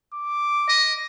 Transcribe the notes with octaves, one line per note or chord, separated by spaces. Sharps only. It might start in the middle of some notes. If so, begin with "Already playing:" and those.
D6
D#5